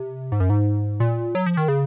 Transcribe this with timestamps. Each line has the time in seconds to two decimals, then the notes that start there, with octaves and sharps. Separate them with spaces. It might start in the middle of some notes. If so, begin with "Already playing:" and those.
Already playing: C3
0.32 G#2
0.40 F#2
0.50 G#2
1.00 A#2
1.35 F#3
1.46 F3
1.57 D#3
1.68 C#3